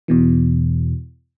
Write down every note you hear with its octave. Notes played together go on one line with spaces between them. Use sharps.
E2 B2 E3